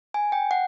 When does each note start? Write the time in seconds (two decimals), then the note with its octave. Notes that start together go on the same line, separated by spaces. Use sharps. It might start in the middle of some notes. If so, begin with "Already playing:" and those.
0.14 G#5
0.32 G5
0.51 F#5